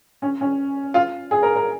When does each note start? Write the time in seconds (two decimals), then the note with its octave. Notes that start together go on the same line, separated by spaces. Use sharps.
0.22 C#4
0.41 C#4
0.94 F4
1.31 G#4
1.43 A#4
1.56 A#4